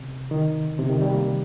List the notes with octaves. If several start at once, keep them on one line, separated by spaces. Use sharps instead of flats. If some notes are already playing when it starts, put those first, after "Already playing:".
Already playing: C3
D#3
C3
D#3
G3
A#3